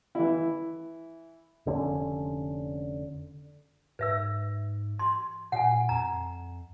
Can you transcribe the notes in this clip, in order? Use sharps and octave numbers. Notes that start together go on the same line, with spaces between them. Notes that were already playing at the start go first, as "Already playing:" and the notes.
E3 E4
F1 D3 C#4
G#2 B4 E5 E6
C6
A#2 F#5 G#5
F2 A#5